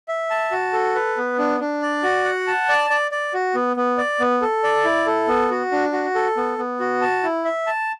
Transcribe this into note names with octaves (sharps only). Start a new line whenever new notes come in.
E5
A5
F#4
A4
B4
B3
D4
D4
D5
F#4
F#5
A5
D5
D5
D5
F#4
B3
B3
D5
B3
A4
D5
E4
A4
B3
F#4
D4
F#4
A4
B3
B3
F#4
A5
E4
E5
A5